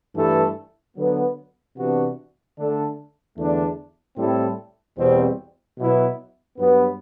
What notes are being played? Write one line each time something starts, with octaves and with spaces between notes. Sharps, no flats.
G2 E3 A3 E4 A4
D3 F#3 B3
C3 E3 B3 D4 F#4
D3 A3 D4 A4
E2 D3 A3 D4
A2 G3 C4 E4 A4
E2 B2 G3 C4
B2 F#3 B3 E4
G2 F#3 B3